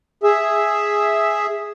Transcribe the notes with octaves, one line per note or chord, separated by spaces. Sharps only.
G#4 E5